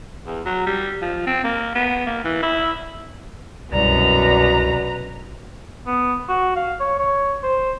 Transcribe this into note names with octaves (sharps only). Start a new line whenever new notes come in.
E2
F#3
G3
F3
C4
A#3
B3
A#3
E3
E4
C2 F#2 B2 F#4 B4 D5 A#5
B3
F#4
F5
C#5
C#5
C5